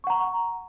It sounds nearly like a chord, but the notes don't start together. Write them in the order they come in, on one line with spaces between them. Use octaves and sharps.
C#6 F#5 A#5